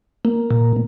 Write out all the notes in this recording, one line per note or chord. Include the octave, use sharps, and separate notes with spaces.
A#3
A#2